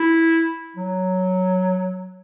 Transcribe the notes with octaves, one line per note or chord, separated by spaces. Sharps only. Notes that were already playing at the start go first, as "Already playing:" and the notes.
Already playing: E4
F#3